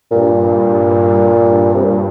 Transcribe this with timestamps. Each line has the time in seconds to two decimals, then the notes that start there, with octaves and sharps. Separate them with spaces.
0.11 G2 A#2
1.75 C3
1.83 A#2